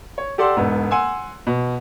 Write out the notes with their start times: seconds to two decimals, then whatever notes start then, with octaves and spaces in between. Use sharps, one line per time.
0.18 C#5
0.38 G4 A4 D5 F#5 C6 E6
0.56 E1 G#2 B3
0.91 F#5 G#5 C6 E6
1.47 B2